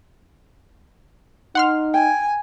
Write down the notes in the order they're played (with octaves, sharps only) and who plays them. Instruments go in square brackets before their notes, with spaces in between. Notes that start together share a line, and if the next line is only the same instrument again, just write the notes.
[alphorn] D#4 [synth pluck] F#5 C6 F6
[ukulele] G5 [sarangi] G#5